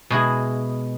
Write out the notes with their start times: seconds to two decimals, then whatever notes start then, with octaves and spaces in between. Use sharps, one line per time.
0.10 B2 G#3 E4 G#4